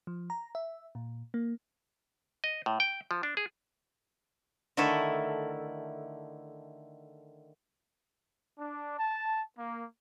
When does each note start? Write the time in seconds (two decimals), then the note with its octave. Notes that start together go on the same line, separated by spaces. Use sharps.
0.07 F3
0.30 A#5
0.55 E5
0.95 A#2
1.34 A#3
2.44 D#5
2.66 A2
2.80 G5
3.11 F3
3.23 D4
3.37 G#4
4.77 D3 D#3 A3 E4 A4
8.58 D4
8.97 A5
9.57 A#3